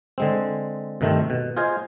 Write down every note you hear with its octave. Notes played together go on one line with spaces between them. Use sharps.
D3 G#3 C4
G2 C3 D#3 A3 C4
B2
F4 G#4 C5 D#5 F5 G#5